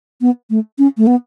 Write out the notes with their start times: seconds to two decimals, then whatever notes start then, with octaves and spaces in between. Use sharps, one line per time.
0.21 B3
0.50 A3
0.79 C#4
0.98 A3
1.07 B3